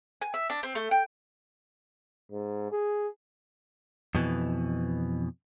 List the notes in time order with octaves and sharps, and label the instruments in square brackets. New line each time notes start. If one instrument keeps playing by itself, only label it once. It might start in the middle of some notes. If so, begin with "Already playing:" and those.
[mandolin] G#5
E5
D4
C4
A3
G5
[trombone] G#2
G#4
[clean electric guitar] F2 B2 E3